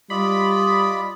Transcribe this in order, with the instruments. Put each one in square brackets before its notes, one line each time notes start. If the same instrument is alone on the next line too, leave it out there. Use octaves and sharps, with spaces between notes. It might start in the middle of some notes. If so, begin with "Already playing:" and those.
[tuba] G3 [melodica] F4 D5 D#5 [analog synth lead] B5